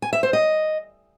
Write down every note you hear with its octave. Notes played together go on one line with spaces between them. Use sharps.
G#5
E5
C5
D#5